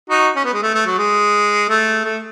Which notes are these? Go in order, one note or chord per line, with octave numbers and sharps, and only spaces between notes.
D#4 F#4
C#4
B3
G#3
A3
A3
F#3
G#3
A3
A3